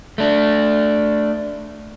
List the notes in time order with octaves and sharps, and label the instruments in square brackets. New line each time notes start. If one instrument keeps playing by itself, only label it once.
[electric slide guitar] A3 D4